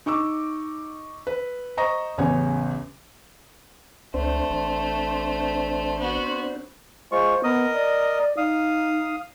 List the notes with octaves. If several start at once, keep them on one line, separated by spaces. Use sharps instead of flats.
D#4 C#6 D6 E6
B4
C5 D#5 A#5 C#6 D#6 A#6
A1 E2 C#3 C#5 F#5 G#5
C#2 A3 C4 D4 C5
A1
B3 F#4
G#3 F4 C5 C#6
B3 A#4 D#5 D#6
D5
D#4 F5 D#6